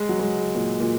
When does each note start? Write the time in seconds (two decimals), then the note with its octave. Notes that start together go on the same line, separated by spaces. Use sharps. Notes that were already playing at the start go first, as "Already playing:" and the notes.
Already playing: G#3
0.09 F#3
0.19 G#3
0.55 A#2
0.80 A#2